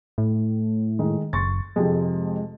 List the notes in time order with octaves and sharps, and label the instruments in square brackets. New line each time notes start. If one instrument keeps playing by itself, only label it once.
[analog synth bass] A2
[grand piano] D#3 G#3
[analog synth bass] F#1 [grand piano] C6 C#6 A6
[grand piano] F2 C3 F3 [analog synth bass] G#3